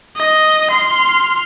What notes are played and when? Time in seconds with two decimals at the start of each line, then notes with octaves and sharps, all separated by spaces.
0.16 D#5
0.71 C6 F6